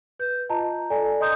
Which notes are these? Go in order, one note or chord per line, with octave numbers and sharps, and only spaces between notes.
B4 G6
F4 D#5 A5 A#5
A4 D5 G#5
D#5 A#5 C6 D#6 G6